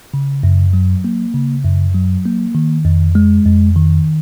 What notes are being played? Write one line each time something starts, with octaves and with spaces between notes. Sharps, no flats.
C#3
F#2
F#3
A#3
C#3
F#2
F#3
A#3
D#3
F2
G#3
F2
D#3